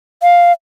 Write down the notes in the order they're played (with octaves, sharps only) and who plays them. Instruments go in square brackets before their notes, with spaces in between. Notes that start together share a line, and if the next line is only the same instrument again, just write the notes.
[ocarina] F5